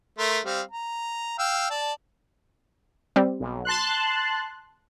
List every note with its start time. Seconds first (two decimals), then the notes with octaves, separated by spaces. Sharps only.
0.19 A3 A#4 C6
0.45 G3 C4 F5
0.72 A#5
1.39 F5 G5 E6
1.70 D5 A5
3.16 G3 C4
3.40 B1
3.65 A5 C6 F#6